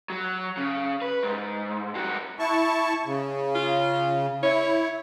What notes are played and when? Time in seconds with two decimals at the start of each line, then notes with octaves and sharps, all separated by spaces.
0.10 F#3
0.57 C#3
1.02 B4
1.23 G#2
1.95 G2 F#4
2.39 E4 A5 C#6
3.06 C#3
3.55 F4
4.43 E4 C#5